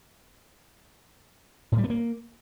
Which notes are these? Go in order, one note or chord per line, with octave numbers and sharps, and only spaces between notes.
A2
G3
B3
A#3